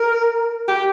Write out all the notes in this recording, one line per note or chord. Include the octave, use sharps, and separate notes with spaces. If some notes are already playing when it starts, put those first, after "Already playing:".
Already playing: A#4
G4